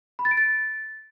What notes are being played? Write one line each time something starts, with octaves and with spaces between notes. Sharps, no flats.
B5
A6
D7
A6